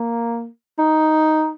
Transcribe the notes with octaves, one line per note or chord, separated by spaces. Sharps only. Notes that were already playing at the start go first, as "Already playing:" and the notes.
Already playing: A#3
D#4